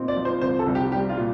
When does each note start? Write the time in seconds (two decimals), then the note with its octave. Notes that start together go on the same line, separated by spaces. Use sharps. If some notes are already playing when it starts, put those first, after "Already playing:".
Already playing: A#2 C4 D#4
0.08 D5
0.17 F3
0.25 C5
0.41 C2 C5
0.59 A4
0.66 C2
0.75 G4
0.92 G3 G4
1.09 F4
1.17 A#2